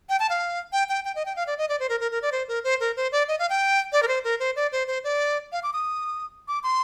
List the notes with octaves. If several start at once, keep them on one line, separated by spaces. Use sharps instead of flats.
G5
A5
F5
G5
G5
G5
D#5
G5
F5
D5
D#5
D5
C5
A#4
A#4
A#4
D5
C5
A#4
C5
A#4
C5
D5
D#5
F5
G5
D5
A#4
C5
A#4
C5
D5
C5
C5
D5
F5
D6
D#6
D6
C6